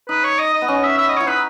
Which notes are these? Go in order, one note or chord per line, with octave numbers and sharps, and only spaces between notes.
D#4 B4
C#5
D#5
D#5
B3
C#4 D#5
E5
E5
D#5
E4 C#5
D#4 B4